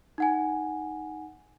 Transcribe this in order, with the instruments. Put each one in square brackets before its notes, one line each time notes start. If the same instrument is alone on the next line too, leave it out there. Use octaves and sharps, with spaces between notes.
[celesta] D#4 F#5 G#5